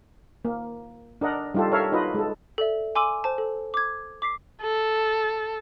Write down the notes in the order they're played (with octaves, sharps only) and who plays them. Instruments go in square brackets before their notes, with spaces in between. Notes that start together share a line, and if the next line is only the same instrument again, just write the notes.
[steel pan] A#3
D4 A#4 D#5 F#5
G3 D#4 F4 G4 A4
A4 A#4 C#5 E5 F5
D#4 F4 F#4 B4 D#5
G#3 A4
[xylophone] A4 D5 E5
G#5 C6 D6 E6 D#7 F#7
C5 A5
A4
D6 G#6
D6 B6 C7
[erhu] A4